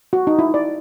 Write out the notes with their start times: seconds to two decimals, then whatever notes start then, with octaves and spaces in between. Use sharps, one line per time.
0.13 F#4
0.27 D#4
0.39 E4
0.54 D5